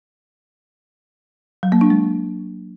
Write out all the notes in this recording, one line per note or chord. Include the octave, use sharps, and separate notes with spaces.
F#3
A#3
D4
G#3